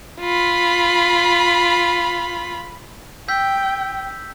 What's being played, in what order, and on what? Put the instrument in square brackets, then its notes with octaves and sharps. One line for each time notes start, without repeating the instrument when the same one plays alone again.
[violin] F4 B5
[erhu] G5 [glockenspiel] E6 G6 B6